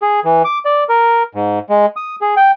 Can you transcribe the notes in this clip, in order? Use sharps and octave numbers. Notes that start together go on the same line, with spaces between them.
G#4
E3
D6
D5
A#4
G#2
G#3
D#6
G#4
G5